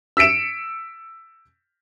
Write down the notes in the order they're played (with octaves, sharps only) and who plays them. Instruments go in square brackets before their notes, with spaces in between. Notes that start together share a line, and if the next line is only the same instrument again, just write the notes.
[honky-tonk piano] E6 B6 C#7 D7 E7